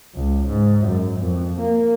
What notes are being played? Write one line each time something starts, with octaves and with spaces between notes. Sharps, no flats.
C#2
G#2
F#2
F2
A#3